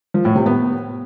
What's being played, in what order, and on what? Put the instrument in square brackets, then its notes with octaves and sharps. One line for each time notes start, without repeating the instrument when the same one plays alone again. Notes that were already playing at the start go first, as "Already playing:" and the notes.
[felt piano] F3
A2
C3
B3